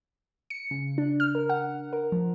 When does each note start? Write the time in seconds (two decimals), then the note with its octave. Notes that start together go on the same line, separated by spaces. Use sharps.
0.50 C#7
0.71 C#3
0.98 D4
1.20 F6
1.35 A#4
1.49 F#5
1.93 A#4
2.12 F3